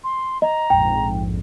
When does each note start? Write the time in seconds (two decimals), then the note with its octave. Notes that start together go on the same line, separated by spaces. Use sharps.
0.04 C6
0.42 D#5 A#5
0.70 A#1 F2 G#2 G5